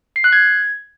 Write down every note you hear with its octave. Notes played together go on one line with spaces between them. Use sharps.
C7
F#6
G#6